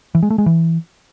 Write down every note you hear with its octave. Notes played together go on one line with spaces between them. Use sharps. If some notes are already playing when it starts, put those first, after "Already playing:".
E3
G#3
A3
G#3
E3